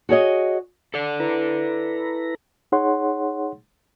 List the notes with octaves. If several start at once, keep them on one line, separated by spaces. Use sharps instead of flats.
F#4 G#4 C#5 D#5
A4 D5
E4 B4 A#5
D#4 G#4 C#5 F#5 C6